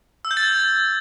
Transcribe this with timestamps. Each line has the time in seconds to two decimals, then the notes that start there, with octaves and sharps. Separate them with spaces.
0.25 E6
0.31 G6
0.37 A6
0.43 G#6